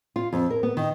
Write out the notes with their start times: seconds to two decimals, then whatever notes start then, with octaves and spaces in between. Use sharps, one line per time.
0.16 F4
0.33 F2
0.50 A#4
0.63 B3
0.77 D#3